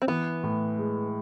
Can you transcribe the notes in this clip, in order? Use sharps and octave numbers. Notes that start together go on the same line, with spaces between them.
C4
E3 B3
A2
G#3